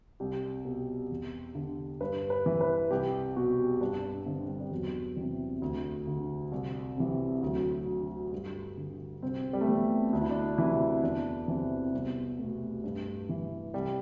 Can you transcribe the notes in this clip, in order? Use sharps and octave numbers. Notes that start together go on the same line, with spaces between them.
C2 G4
B2 G4
E2
D3
G2 B4
B4
E3
B4
C2 G4
B2 F#4
G2 D4
D4
D3 C4
G3
G3
E2 F#3
C3 E3 G3
D2
D3
C2
C3 E3
D2 F#3
D3
G2 G3
D3
C2 C4
G3
A3
C3 E3 B3
D2 D4
E4
D4
C3 E3 E4
E2 D4
C3 E3 C4
C4
C2 B3
B2 A3
G2
E3
C2 G3